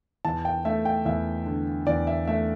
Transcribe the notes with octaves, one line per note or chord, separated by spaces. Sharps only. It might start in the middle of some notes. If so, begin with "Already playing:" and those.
E2 A5
G5
A3 E5
G5
E2 E5
D3
E2 D5
E5
A3 E5